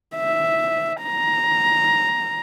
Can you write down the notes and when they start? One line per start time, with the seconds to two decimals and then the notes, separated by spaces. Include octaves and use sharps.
0.16 E5
1.03 A#5